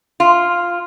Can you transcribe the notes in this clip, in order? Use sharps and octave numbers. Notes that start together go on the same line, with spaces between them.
F4